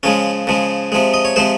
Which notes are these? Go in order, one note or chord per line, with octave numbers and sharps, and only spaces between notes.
C#3 F3 G#3 C#4
C#3 F3 G#3
C3 F3 G#3
D#5
C#5
C3 F3 G#3 C5